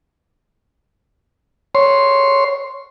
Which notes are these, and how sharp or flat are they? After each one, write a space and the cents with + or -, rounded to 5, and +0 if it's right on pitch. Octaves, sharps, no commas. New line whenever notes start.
C#5 +0 C6 +0